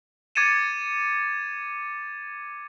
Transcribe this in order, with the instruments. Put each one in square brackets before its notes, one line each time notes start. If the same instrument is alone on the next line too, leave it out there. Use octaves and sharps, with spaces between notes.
[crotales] D6 G#6 A6 C#7 D#7 E7